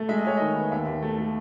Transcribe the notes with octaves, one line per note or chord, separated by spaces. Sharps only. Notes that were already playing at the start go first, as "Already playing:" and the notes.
Already playing: A3
G#3 E5
D#5
G#3 C#5
D#3 D#5
B3
D#2 E5
D#2
A3
A3